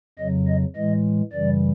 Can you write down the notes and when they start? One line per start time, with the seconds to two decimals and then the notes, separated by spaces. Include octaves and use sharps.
0.19 F2 C#3 F#3 D#5
0.48 D#5
0.76 A2 E3 G#3 D#5
1.32 F#2 C#3 E3 G3 D5